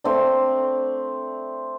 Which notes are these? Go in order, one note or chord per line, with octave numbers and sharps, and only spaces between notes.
A3 C4 D4